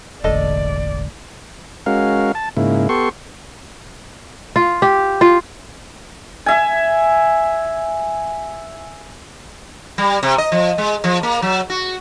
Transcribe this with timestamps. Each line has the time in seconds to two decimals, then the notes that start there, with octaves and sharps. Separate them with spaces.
0.24 E1 A1 D3 A3 A4 D5 D#5
1.86 G#3 C#4 F#4 A#4 F5
2.35 A5
2.57 G#2 C#3 A#3 E4
2.89 B3 G4 A4 C6 C#6
4.56 F4
4.82 G4
5.21 F4
6.46 E5 G#5
9.98 G3
10.23 C3
10.38 D#5
10.52 F3
10.78 G#3
11.04 F3
11.23 A#3
11.42 F#3
11.70 F#4